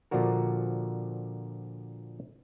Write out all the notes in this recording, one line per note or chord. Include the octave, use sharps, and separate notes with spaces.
A#2 D3 F3 D4 F#4 A#4